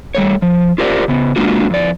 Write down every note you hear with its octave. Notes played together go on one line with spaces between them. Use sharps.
G3 A3 C#5
F3
F4 G4 A#4 C5 D5
C#3 B3
G#3 A#3 D4 F4 F#4
F2 D5